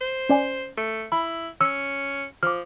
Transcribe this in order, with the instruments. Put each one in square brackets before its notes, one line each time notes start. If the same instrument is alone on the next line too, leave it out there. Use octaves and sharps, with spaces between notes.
[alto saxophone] C5
[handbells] C#4 D5 G#5
[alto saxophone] A3
[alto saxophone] E4 [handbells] B5
[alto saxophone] C#4 [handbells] E6
[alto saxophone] F3 [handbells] D6 F6